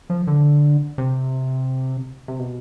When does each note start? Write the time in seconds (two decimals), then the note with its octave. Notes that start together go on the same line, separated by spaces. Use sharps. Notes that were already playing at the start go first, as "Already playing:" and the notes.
0.10 F3
0.27 D3
0.98 C3
2.28 C3
2.39 B2